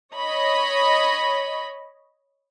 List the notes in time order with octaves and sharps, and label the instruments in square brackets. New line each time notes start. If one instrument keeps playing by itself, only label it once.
[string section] C#5 D#5 B5